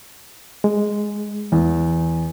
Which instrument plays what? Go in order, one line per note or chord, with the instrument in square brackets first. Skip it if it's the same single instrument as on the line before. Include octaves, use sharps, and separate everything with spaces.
[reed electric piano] G#3
[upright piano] E2